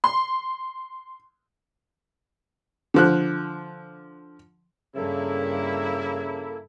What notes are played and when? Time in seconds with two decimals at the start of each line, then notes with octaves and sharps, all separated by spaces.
0.04 C6
2.94 D3 F3 F#6
4.95 G2 C#3 A#3 E4 A4